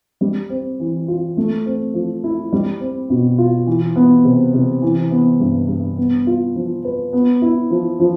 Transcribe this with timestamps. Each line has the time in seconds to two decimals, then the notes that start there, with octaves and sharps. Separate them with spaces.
0.21 G3
0.50 C4
0.80 E3
1.08 F4
1.37 A3
1.66 C4
1.94 F3
2.24 E4
2.52 G3
2.80 C4
3.10 B2
3.38 F4
3.67 E3
3.96 B3
4.25 C3
4.54 C3
4.82 E3
5.11 B3
5.40 G2
5.68 G2
5.97 B3
6.27 F4
6.55 F3
6.84 B4
7.13 B3
7.42 E4
7.70 F3
8.00 F3